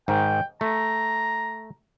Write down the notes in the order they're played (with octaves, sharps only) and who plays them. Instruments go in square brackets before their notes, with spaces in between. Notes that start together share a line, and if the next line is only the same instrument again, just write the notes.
[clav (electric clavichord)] G#2 D#3 [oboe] G5
[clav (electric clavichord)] A3 [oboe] A#5